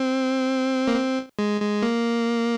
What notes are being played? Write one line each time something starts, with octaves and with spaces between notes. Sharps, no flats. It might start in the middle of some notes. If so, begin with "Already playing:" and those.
Already playing: C4
A#3
C4
G#3
G#3
A#3